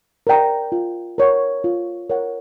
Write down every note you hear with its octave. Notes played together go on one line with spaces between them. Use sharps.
A#4 D5 G5 A#5
F4
A#4 C#5 F#5
F4
A#4 C#5 F#5